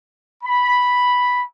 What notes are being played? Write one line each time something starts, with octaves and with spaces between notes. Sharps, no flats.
B5